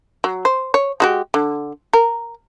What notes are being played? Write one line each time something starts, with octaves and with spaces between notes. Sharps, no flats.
F#3
C5
C#5
G#3 F#4 G4
D3
A#4